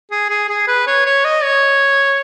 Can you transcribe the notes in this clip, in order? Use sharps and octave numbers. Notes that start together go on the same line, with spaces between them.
G#4
G#4
G#4
B4
C#5
C#5
D#5
C#5